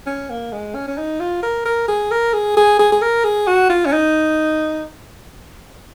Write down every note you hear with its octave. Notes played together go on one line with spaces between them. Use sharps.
C#4
A#3
G#3
C#4
C#4
D#4
F4
A#4
A#4
G#4
A#4
G#4
G#4
G#4
G#4
A#4
G#4
F#4
F4
C#4
D#4